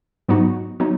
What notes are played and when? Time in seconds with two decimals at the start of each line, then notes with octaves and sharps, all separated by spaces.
0.28 G#2 F#3 B3 D#4 F#4
0.80 F#3 B3 D#4 F#4